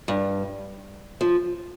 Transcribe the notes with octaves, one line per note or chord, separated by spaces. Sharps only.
G2
F3